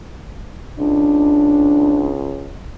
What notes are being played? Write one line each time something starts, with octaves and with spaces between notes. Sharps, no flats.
C#2 D4